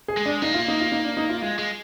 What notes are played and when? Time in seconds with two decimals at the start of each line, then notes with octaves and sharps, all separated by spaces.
0.08 G#4
0.17 G#3
0.26 D4
0.42 A#3 D#4
0.54 F4
0.68 D#4
0.80 F4
0.92 D#4
1.05 D4
1.17 D#4
1.29 F4
1.42 G#3 F4
1.59 G#3